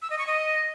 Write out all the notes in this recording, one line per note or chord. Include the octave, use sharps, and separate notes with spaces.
E6
D#5
C#6
D#5